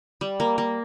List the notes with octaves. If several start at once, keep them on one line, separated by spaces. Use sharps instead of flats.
G3
A#3
A#3